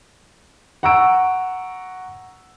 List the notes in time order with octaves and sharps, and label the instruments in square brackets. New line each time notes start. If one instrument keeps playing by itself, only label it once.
[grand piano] F#5 A#5 C#6 E6 D7